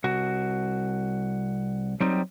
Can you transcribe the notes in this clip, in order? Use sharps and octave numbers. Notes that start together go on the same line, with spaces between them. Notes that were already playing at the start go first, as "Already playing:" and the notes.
C2 F#4
F#3 G3 C4 D#4